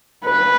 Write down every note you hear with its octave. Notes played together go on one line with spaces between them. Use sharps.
B4